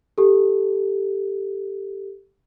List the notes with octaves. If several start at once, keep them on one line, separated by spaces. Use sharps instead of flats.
G4 A4